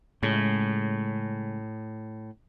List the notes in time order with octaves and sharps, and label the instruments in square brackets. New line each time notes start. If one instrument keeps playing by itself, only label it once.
[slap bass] A2 [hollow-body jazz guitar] C#3 G#3 G#4